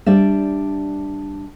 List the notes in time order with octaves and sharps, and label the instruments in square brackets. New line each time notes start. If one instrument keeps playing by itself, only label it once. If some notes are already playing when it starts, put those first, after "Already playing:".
[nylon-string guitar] G3 D4 D5 E5